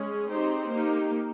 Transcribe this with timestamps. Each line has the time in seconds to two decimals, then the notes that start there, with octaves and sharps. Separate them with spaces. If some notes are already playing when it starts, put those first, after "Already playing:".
Already playing: G#3 C#4 G#4
0.31 C4 D#4 G4 C5
0.72 A#3 D#4 G4